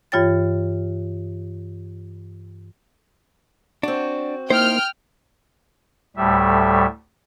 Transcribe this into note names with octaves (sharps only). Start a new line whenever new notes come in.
G2 E3 F4 C#5 G5 A6
C4 D4 F#4
A#3 D#4 E4 C5 G5 F6
D2 A2 G3 E5